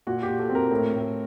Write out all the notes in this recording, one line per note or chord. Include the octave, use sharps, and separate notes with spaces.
A#2 F#4
G4
A#2
A4
C4
A#4
A2
A2